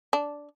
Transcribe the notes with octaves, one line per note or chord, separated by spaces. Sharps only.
D4